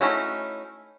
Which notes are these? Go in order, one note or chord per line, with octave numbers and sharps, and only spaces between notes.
A3 C#4 D#4 E4 F#4